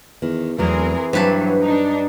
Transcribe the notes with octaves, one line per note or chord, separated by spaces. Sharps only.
E2 D#3
E2 E3 F#3 A3 C4 G#4 A#4
G2 F#3 B4 C5 A5
D4 D#4